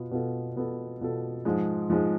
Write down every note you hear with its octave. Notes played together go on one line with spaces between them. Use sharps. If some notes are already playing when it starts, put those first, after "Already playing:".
Already playing: B2 B3 F4
B2 B3 F4 A4
B2 B3 F4 A4
B2 B3 F4 A4
G#2 F3 G#3
G#2 F3 G#3